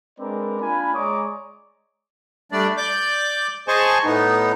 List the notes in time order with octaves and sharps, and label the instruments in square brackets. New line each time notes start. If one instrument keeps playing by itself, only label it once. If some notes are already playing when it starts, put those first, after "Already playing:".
[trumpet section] G#3 C4 D4 A#4 B4 D5
A#3 D4 F4 G#5 B5
G#3 C#5 D5 A#5 D6 D#6
[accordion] G3 A3 D4 D5
D5 D6 G6
G#4 C5 D#5 G#5 A5 C#6
A2 B3 D#4